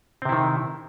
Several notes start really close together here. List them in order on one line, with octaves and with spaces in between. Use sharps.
C4 C3 E4 D#3